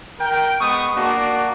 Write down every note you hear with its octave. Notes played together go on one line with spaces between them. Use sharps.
A#4 G5
G#3 B3 C#6 D#6
A#3 D4 F#4